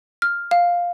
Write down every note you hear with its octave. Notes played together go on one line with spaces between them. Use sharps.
F6
F5